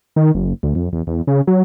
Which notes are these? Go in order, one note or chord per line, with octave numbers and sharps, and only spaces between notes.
D#3
F#1
D2
F2
E2
E2
C#3
F#3